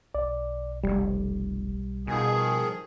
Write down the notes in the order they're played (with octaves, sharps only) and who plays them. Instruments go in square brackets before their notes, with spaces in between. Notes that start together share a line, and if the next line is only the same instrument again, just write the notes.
[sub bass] B1 [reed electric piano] D5
[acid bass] F1 [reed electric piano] G3
[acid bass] B2 [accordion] D#3 F3 G#4